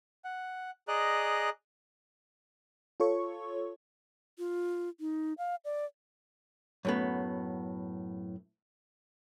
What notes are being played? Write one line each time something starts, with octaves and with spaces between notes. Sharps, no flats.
F#5
G#4 D5 D#5 A#5 F#6
F4 A4 C#5 C#6
F4
D#4
F5
D5
F#2 A2 B3